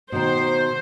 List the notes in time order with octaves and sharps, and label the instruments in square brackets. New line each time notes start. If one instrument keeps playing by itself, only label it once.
[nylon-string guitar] B2 D#3 [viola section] C5